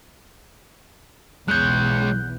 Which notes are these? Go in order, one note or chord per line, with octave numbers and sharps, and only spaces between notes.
B1 E2 G#3 C#5 F#6 G6